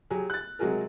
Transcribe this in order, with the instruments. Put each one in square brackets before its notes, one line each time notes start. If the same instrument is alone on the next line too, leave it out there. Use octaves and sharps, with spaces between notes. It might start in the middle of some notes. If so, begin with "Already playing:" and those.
[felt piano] F#3 G4 G#4
F#6 A6
C3 F#3 G#3 F#4 G#4 A#4